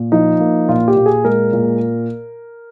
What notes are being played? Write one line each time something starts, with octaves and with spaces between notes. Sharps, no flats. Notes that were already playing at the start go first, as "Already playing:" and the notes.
Already playing: A#2
F3 D#4
A#3
A#2 F4
G4
A#2
G#4
G#3 A#4
A#2